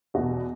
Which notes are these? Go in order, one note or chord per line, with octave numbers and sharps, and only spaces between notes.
E2 B2 F#4